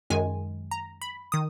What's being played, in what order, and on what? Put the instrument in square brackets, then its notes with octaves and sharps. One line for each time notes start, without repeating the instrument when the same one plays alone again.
[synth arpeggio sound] F#2 D#3 G#3 G#5
A#5
B5
D#3 D#6